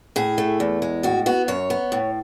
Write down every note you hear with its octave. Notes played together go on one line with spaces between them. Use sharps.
A2 G#4
A3
E2
G#3
A2 F#4
B3 F#4
F#2 C#5
B3
A2